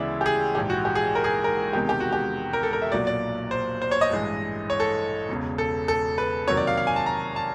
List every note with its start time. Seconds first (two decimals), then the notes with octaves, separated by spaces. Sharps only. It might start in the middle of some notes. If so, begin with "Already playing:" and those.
Already playing: D2 C#3 E3 G#3 B3 D5 E5
0.21 G4
0.26 G#4
0.55 A#1 G#2 E3 G4
0.70 F#4
0.85 G4
0.95 G#4
1.15 A#4
1.24 G#4
1.44 A#4
1.73 E1 E2 C3 D#3 G#3 G4
1.89 G4
2.00 F#4
2.13 G4
2.53 A#4
2.63 A4
2.73 A#4
2.82 E5
2.92 B1 A#2 F#3 D5
3.07 D5
3.51 C5
3.82 C5
3.91 C#5
4.01 D#5
4.10 A1 G2 E3 G#3
4.70 C#5
4.80 A4
5.29 E1 E2 C#3
5.58 A4
5.88 A4
6.18 B4
6.47 F2 C3 D#3 F#3 A#3 C#5
6.57 D5
6.67 F5
6.77 F5
6.87 G#5
6.96 A5
7.06 A#5
7.36 A5